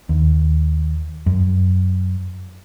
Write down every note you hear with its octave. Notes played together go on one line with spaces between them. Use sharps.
D#2
F#2